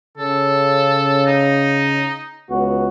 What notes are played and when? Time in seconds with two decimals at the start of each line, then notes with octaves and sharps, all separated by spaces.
0.18 C#3 A4
1.27 D#4
2.51 C#2 B3 F#4